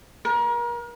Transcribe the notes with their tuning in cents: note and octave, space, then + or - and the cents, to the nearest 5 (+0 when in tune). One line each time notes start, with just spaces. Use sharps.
A#4 +35